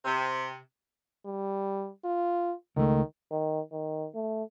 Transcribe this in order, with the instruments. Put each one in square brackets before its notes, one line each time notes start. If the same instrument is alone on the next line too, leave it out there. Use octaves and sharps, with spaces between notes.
[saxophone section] C3
[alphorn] G3
F4
[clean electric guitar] C#2 A3 [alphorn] D#3
[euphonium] D#3
D#3
A3